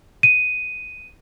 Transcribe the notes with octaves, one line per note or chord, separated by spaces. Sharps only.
D#7